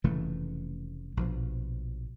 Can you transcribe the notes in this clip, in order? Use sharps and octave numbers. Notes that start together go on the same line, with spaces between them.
F1 C#3 E3 A3
A#1 B2 F3